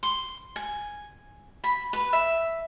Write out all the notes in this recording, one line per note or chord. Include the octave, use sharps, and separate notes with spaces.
C6
G#5
B5
B4
E5